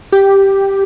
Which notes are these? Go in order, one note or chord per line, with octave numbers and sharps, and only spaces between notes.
G4